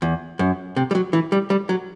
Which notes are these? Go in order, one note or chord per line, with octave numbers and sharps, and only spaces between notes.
E2
F#2
C3
G3
F#3
E3
G3
G3
F#3